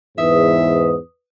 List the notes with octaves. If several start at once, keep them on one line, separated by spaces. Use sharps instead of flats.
E2 G#2 B4 E5 D#6